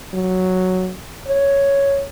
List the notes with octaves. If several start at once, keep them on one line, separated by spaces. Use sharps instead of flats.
F#3
C#5